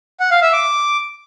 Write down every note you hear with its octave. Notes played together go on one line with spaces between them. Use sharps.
F#5
F5
E5
D6